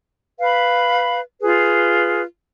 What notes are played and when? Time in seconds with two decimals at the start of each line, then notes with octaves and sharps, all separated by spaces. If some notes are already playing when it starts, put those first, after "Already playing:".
0.40 B4 F5 B5
1.41 F4 G#4 B4